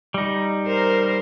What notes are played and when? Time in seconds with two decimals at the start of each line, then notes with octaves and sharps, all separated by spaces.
0.14 G3 D#4
0.66 A#4 C5